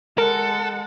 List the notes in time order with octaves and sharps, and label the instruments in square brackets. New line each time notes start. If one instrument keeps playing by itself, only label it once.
[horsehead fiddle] G#3 F#5 [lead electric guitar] A4 [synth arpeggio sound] A#4